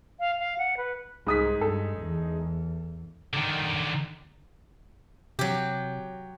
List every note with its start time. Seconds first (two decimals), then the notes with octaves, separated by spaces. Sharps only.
0.20 F5
0.39 F5
0.58 F#5
0.77 B4
1.27 C2 G#2 G#3 D#4 G#4 D#6 B6
1.61 G2 A4
1.98 E2
3.34 D3 D#3
5.39 C3 F#3 G4